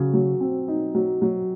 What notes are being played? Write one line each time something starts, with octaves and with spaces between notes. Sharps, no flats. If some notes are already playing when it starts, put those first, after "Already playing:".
Already playing: C#3 F#3
F#3
C4
D#4
F#3
F#3